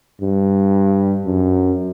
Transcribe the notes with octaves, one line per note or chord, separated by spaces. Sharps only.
G2
F#2